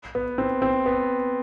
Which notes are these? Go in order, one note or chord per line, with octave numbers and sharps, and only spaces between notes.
B3
C4
C4
B3